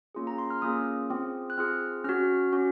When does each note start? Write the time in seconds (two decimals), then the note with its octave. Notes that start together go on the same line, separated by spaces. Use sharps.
0.15 A#3 C#4 F4 G#4
0.27 A#5
0.38 C6
0.50 F6
0.62 A#3 C#4 F4 G#4 D#6
1.10 C4 F4 G#4
1.50 F#6
1.57 C4 F4 G#4 F6
2.04 C#4 F#4 F6
2.53 C#4 F#4